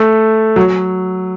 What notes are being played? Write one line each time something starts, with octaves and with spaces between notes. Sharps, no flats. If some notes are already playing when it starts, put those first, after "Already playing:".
Already playing: A3
F#3